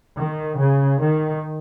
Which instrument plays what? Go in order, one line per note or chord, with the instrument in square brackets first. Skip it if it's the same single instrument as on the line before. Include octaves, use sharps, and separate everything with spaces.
[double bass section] D#3
C#3
D#3